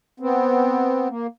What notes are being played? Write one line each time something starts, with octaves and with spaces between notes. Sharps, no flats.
B3 C4
A#3